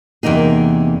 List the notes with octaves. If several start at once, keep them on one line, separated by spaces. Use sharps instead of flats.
E2 C3 A#3 D#4 G#4